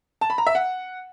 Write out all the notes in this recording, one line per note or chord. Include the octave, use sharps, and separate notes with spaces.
A5
B5
A#5
E5
F#5